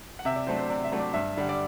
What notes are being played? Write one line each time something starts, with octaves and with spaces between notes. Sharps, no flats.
F#5
C3 E5
D5
F#3 A3 D4 C5
C5
C3 D5
E5
F#3 A3 D4
D5
G2 E5
D3 G3 D4
D5